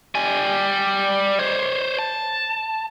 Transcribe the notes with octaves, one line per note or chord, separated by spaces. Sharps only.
G3 G#5
C5 C#5
A5